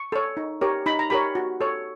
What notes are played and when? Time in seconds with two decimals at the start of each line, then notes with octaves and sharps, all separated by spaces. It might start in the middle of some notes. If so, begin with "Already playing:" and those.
Already playing: C#6
0.12 A4 C#5
0.37 D#4
0.61 G4 A#4 C#5
0.86 D#4 B5
0.99 A#5
1.10 G4 A#4 C#5 B5
1.35 F#4
1.61 A4 C#5